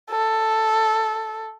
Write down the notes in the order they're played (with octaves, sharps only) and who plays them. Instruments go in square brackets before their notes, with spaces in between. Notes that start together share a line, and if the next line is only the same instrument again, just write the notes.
[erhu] A4